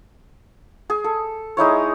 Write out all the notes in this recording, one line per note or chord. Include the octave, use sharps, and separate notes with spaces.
G#4
A4
G#3 D#4 E4 C#5